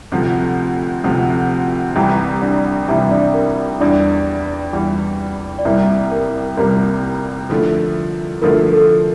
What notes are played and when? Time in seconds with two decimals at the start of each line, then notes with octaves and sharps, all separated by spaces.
0.12 D2 C3 F3
1.04 D2 C3 F3
1.96 C2 C3 E3 G3 G4 G5
2.42 D4 D5
2.88 C2 C3 E3 G3 E4 E5
3.11 D4 D5
3.34 A#4
3.81 E2 E3 G3 D4 D5
4.73 E2 E3 G3
5.59 D5
5.65 C2 C3 G3 A#3 E4 E5
6.11 A#4
6.57 C2 C3 G3 A#3 A#4
7.50 D3 F3 A3 E4
8.42 D3 F3 A3 E4 A#4
8.73 A4